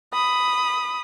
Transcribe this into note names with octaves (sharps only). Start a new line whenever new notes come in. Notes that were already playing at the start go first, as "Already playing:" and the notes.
B5 D#6